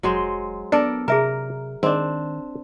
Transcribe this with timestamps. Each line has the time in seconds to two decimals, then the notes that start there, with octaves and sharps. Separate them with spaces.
0.03 F1 F#3 G#3 C5
0.72 B3 D4 A4 A#4 D5
1.08 C3 G#4 A#4 E5 A#5
1.83 G#2 D#3 C4 D4